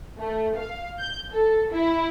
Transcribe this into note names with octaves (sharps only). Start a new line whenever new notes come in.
A3
F5
G6
A4
E4